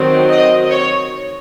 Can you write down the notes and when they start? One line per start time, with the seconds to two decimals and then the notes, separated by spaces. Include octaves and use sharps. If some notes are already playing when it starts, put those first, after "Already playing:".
Already playing: D#3 F#3 C4
0.31 D#5
0.71 C#5